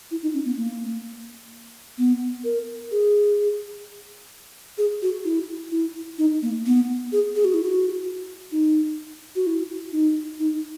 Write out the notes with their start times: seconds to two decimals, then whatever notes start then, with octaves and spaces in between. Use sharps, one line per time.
0.11 E4
0.22 D#4
0.34 C#4
0.45 B3
0.57 A#3
1.98 B3
2.44 A#4
2.91 G#4
4.78 G#4
5.02 F#4
5.25 E4
5.71 E4
6.18 D#4
6.42 A#3
6.66 B3
7.12 G#4
7.36 G#4
7.45 F#4
7.54 E4
7.63 F#4
8.52 D#4
9.36 F#4
9.47 E4
9.93 D#4
10.39 D#4